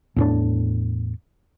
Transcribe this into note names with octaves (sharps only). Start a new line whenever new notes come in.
E2 A2 D4